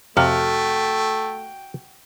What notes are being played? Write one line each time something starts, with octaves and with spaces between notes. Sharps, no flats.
F2 C3 A3 F#4 G5 F6